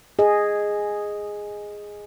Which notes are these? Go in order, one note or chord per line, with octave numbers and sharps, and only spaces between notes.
G#4 D#5